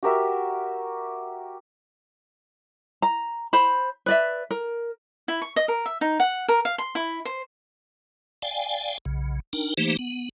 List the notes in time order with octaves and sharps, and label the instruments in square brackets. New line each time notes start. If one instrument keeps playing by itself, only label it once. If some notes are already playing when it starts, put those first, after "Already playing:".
[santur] F#4 G4 A#4 E5
[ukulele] A#5
C5 B5
B4 D5 E5
A#4
[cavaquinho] E4
C#6
D#5
A#4
E5
D#4
F#5
A#4
F5
C6
E4
C5
[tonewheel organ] D5 F5 G5 G#5
B1 C#3
D4 D#4 A#4 G5
E3 A3 A#3 D#4 G4 C5
B3